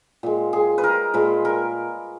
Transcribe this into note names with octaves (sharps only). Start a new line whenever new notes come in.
A#2 G#3
G#4
B4
A#4
A#2 G#3 B4
A#4